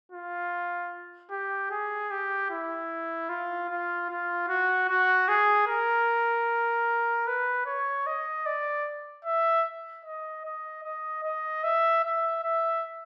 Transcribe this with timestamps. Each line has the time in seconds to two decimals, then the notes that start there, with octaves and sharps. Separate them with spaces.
0.12 F4
1.31 G4
1.71 G#4
2.11 G4
2.50 E4
3.29 F4
3.69 F4
4.10 F4
4.48 F#4
4.89 F#4
5.28 G#4
5.67 A#4
7.27 B4
7.66 C#5
8.07 D#5
8.46 D5
9.25 E5
10.05 D#5
10.45 D#5
10.84 D#5
11.23 D#5
11.64 E5
12.04 E5
12.43 E5